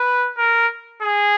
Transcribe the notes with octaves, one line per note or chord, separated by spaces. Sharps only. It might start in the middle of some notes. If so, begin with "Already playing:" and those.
Already playing: B4
A#4
G#4